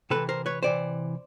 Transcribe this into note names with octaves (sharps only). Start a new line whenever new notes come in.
C3 E3 A4 B4
A#4 C5
B4 C#5
C3 E3 C5 D5